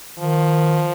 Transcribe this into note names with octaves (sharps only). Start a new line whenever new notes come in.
D#3 F3